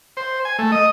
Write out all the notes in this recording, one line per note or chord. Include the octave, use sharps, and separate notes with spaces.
C5
G#5
A3
D#5